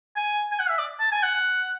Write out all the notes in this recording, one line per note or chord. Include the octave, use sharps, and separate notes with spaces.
G#5
G#5
F#5
E5
D5
A5
G#5
F#5